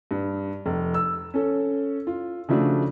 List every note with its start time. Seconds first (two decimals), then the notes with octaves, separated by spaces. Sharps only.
0.11 G2
0.66 F1
0.94 E6
1.34 C#4 A4
2.07 F4
2.49 C#3 F3 A3 D4 F#4